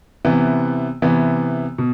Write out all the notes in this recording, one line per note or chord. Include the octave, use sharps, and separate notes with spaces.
C3 E3 B3
C3 E3 B3
B2